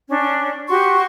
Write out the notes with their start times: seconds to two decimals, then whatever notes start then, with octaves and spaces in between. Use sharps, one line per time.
0.09 C#4 D4
0.69 F#4 G4 C6 C#6